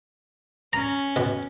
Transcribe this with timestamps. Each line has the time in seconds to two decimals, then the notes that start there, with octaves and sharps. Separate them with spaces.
0.73 C#4 A#5
1.16 B2